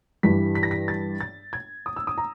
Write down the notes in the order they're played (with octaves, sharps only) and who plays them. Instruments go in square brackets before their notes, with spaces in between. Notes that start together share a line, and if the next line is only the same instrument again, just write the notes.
[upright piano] G2 E3 G3 B6
B6
A#6
B6
A6
A6
G#6
D#6
E6
D#6
A#5